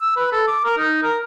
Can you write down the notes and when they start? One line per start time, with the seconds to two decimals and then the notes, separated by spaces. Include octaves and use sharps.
0.01 E6
0.17 B4
0.32 A4
0.47 D6
0.65 A#4
0.78 D#4
1.03 A#4